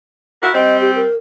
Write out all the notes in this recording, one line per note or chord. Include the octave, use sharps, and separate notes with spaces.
E4 F#4 A#4
G3 C4 D#5
G4
A#4